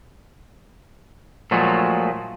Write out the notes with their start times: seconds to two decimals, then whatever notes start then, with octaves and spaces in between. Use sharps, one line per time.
1.51 A#2 F3 F#3 G#3 A3